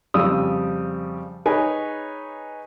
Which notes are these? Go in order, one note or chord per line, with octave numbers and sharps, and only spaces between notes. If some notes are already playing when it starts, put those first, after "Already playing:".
F2 C#3 G3 F4 D#6 E6
D#4 G#4 B4 C#5 G#5